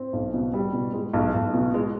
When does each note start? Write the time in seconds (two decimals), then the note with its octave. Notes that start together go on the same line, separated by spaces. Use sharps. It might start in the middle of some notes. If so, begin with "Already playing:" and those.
Already playing: C4
0.13 B1
0.34 B2
0.54 G3
0.73 B2
0.93 G#3
1.13 B1
1.34 B1
1.53 B2
1.74 G#3